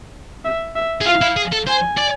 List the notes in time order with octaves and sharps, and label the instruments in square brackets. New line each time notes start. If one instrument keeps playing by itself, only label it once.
[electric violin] E5
E5
[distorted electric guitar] G#4
[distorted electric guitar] F4 [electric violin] F5
[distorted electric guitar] E4
G#4
A4
[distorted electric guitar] C5 [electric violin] G#5
[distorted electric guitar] D5